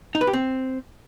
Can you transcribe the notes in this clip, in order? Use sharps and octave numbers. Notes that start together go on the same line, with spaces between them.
D#4
B4
G4
C4